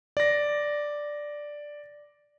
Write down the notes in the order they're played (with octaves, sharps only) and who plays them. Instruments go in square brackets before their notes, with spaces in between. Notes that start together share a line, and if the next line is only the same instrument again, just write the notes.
[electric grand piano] D5 A#6